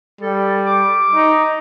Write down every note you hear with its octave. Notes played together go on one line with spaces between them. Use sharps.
G3 A4
D6
D#4